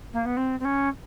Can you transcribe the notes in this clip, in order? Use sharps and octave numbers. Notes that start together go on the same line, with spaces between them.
A#3
B3
C4
C4
C#4